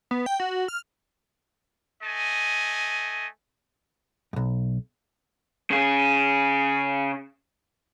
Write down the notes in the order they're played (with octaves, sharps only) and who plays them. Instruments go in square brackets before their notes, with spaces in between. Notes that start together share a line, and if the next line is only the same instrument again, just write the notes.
[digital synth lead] B3
G5
F#4
F6
[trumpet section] A3 D#5 G#5
[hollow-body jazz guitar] B1 F#2
[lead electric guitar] C#3 G#4